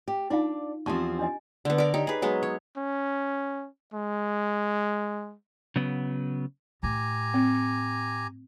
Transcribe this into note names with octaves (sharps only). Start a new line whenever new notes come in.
G4
D4 D#4 F4 D5 F5
E2 F3 C4 G4 A5 C#6
D4 D#5 G#5
D3 B3
A#4 D5
D#4 G4 C#5
G#4 B4
F#3 G#3 B3
C#5
C#4
G#3
C#3 F#3 B3
A2 G4 G#5 A#5
C4